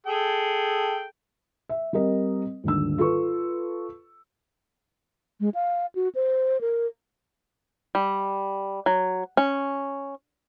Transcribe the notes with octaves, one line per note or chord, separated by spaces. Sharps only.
G#4 A4 G5
E5
G3 C4 A#4 D#5
D#1 G#1 D3 E6
F4 A4 B4 C#6
G#3
F5
F#4
C5
A#4
G3
F#3
C#4